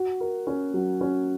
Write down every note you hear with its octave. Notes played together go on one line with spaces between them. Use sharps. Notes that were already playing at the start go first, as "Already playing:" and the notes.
Already playing: F#4
A#4
C#4
F#3
C#4